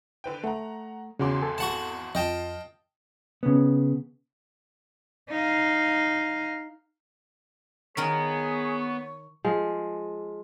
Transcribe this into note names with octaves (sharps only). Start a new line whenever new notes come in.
D3 B4 G5
A3 F#5 A#5
G#1 E2 C#3 F#4 C6 D6
A4 G#5
F#4 F#5 A5
F2 F4 D#5 G5 A5
C#3 B3
D#4 F5
D#3 B3 G#4 A#4 C#5 G#5
F3 G#3